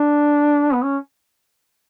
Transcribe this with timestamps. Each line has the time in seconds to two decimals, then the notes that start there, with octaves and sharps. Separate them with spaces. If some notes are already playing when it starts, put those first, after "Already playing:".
Already playing: D4
0.74 B3
0.84 C#4